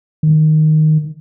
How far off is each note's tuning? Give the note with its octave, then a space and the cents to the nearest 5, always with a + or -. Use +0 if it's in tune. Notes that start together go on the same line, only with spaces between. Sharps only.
D#3 -5